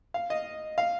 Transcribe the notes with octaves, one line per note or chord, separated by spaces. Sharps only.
F5
D#5
F5